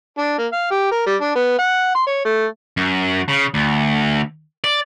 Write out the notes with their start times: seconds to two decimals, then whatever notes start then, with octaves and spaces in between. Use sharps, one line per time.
0.18 D4
0.38 A#3
0.52 F5
0.71 G4
0.91 A#4
1.07 G3
1.21 D4
1.35 B3
1.59 F#5
1.95 C6
2.07 C#5
2.25 A3
2.77 F#2
3.28 C#3
3.54 D2
4.64 D5